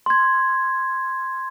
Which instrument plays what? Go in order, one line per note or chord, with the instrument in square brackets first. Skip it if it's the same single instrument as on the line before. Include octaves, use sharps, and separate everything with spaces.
[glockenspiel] C6 G#6